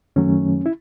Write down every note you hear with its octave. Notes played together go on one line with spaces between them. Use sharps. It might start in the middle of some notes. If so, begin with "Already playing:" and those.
F#2 D#3 F#3 A3 C#4
E4